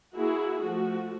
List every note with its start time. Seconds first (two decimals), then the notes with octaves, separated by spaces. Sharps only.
0.16 A#3 E4 F#4 G#4
0.62 F3 A3 F#4